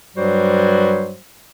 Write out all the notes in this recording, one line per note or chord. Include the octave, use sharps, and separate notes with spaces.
G2 F#3 G3 F#4 C5